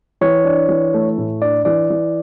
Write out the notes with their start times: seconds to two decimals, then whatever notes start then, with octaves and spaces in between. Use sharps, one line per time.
0.21 E3 C#5
0.45 D4
0.69 E3
0.94 A3
1.18 A2
1.42 D4 D5
1.65 E3 D5
1.90 E3